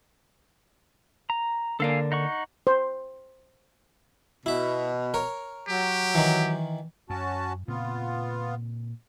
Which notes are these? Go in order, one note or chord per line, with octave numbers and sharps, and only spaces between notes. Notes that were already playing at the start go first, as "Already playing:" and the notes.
A#5
D3 A#3 D4 A4 F5 G#5
D#4 F#5 C#6
C5
B2 E4 E5
A#4 C#5
F#3 G4
D#3 E3
F#2 C#4 F#4 A5
A#2 C#3 B3 C4 F4